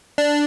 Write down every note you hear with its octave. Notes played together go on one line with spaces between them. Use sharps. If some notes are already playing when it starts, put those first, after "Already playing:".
D4